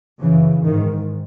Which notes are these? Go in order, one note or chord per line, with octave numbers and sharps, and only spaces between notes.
F#2 C#3 E3
G#2 D#3